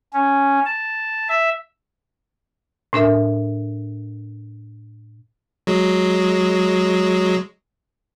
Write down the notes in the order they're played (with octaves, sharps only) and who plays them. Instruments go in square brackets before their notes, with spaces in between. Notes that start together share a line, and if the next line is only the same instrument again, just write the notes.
[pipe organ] C#4
A5
E5
[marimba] A2 D4 A#4 E5
[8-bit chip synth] F#3 G#3